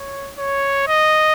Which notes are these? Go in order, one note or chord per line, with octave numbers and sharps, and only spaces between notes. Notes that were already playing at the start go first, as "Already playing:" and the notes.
Already playing: C#5
C#5
D#5